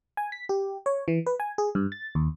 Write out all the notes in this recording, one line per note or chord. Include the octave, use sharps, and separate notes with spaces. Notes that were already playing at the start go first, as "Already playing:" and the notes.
G#5
B6
G4
C#5
E3
B4
G#5
G#4
G2
A6
D#2